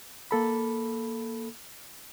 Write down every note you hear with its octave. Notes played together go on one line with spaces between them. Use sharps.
A#3 A4 B5